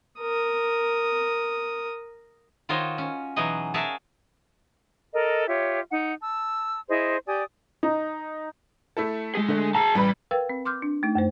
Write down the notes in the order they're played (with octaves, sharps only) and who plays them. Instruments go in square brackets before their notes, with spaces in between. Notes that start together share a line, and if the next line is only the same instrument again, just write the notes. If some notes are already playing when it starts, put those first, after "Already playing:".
[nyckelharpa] A#4 D#6
[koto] D#3 F4 F#4 C5 C#5 D#5
C#4
B2 E3 F#3 D#4 G#4 D#5
F#4 G#4 A#4 E5 F5 A5
[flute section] A4 A#4 D#5
F4 G4 C#5 E5
D#4 F#5
A5 E6
E4 G#4 C5 D#5
G4 D5 G#5 D#6
[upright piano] D#4
[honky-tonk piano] A3 E4 A4
[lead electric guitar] G#3 G#4
[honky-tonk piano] D3 A3
[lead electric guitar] G#4 A5 [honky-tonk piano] A#5
[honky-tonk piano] A1 B4 B5 [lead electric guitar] G3
[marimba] A#4 B4 F5 G5 E6
C4
C6 D6 F6 G6
D4
A3 D#4
F#2 A3 C5